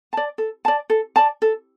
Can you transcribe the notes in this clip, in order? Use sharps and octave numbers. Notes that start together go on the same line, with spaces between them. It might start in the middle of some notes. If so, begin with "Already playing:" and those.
D5 A5
A4
D5 A5
A4
D5 A5
A4